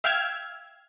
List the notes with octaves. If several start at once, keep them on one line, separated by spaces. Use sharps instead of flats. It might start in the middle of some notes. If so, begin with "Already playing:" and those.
E5 F5 G5 E6 F6 G#6